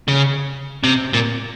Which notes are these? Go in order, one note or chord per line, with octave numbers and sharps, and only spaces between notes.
C#3
C3
A#2